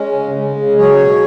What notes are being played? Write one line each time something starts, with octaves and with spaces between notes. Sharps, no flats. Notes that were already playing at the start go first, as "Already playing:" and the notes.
Already playing: G#3 C#4
C#3
G#3
C#3
F#3 G#4 C#5
B2